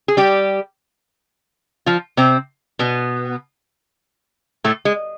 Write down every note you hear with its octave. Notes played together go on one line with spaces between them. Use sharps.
G#4
G3 G4
F3 F4
C3 C4
B2 B3
A2 A3
G#3